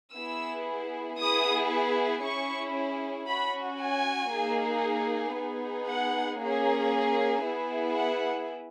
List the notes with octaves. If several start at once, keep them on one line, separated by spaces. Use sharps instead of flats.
B3 E4 G#4 E6
B3 E4 G#4 D#6
C#4 E4 G#4 C#6
C#4 F#4 B5
G#5
A#3 D#4 G#4
B3 D#4 G#4
F#5
A#3 C#4 G#4
B3 E4 G#4
F#5